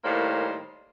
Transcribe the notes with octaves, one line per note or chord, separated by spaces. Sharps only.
A2 D#3 G3 A#3 C5